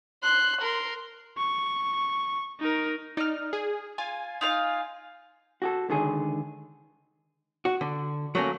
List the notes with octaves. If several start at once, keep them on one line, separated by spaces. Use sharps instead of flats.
C6 F#6
A#4 C6
C#6
D#4 A#4
D#4 D5 F6
G#4
F4 G#5
D#4 F4 F5
F#4 G4 A4
C#2 D3 D#3 G#4
F#4
D3
F#3 A3 A#3 C#4